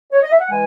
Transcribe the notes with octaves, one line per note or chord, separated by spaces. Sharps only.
C#5
D#5
E5
F#5
E3 G#3 G#5